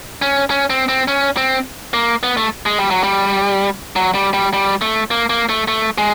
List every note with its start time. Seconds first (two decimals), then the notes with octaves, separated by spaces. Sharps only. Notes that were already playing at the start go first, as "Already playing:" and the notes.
0.22 C#4
0.50 C#4
0.70 C4
0.89 C4
1.08 C#4
1.37 C4
1.94 A#3
2.23 B3
2.37 A3
2.66 G#3
2.79 G3
2.91 F#3
3.04 G3
3.96 F#3
4.15 G3
4.34 G3
4.53 G3
4.82 A3
5.11 A#3
5.30 A#3
5.49 A3
5.68 A3
5.98 G#3